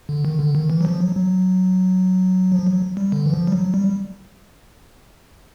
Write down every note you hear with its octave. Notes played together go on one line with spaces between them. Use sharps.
D3
D#3
D3
D#3
E3
F#3
F3
F#3
F#3
F3
F#3
G3
D3
E3
F3
G3
F#3
G3